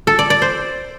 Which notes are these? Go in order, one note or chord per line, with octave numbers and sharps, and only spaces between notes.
A4
D5
D5
C5